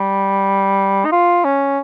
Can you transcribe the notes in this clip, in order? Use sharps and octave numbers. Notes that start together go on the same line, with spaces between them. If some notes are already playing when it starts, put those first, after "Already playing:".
Already playing: G3
D#4
F4
C#4